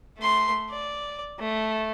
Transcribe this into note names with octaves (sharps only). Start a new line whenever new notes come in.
A3 C6
D5
A3